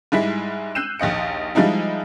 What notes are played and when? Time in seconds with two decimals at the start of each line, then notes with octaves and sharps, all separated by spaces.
0.12 G#2 G3 G#3 E4 B6
0.75 E6 F#6 G6 C7 D#7 E7
1.00 A#1 D#2 D#5 C#7
1.55 F3 G3 G#3 D#4 E4